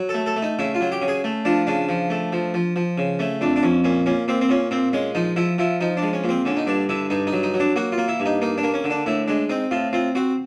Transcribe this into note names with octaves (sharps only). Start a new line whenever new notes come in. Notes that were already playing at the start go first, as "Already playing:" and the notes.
Already playing: F#3
A4
A3
A4
A3
D#4
C#3 E4
F4
F#3
G4
C#3
G#4
A3
F3 D4
C#3 D4
F3
A3
F3
F3
F3
C#3
A3 C#4
F2 D4
D4
F2 C#4
A#2 C#4
A#2 C#4
A#2 C4
C4
A#2 C#4
A#2 C4
G#3 C#4
F3 D#4
F3 E4
F3 E4
F3 D#4
D4
G#3
C#4
A#2
C4
D3 C#4
D#4
G2 D4
D3 E4
G2 D#4
D#4
F#3
D#4
F#3
D4
A#3 F#4
F4
A#3
E4
G2
D#4
A#3 D#4
D4
A#3
C#4
D3
D4
A2 E4
G#3 D4
C4 D#4
A2 F4
C4 F4
C4 F#4